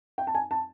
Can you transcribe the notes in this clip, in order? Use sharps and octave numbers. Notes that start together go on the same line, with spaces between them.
G5
A5
G#5
A5